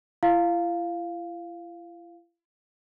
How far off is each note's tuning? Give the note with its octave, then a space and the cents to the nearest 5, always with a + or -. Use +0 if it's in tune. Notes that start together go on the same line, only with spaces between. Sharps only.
E4 +45 F5 +0